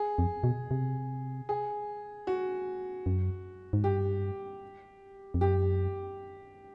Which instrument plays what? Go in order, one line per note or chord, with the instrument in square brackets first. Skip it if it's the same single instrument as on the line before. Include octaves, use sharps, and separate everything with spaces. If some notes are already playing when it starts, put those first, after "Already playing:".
Already playing: [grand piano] G#4
[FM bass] F2
B2
C3
[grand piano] G#4
F#4
[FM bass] F#2
G#2
[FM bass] G2 [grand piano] G4
[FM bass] F2
[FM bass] F#2 [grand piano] G4